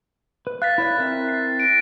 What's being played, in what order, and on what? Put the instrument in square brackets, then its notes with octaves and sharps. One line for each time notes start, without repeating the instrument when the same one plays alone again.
[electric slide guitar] B4
[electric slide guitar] F5 [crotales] F#6 A6 B6
[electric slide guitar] E4 C#5 D5
C4 E4 A#4
[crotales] C7
A#6 D7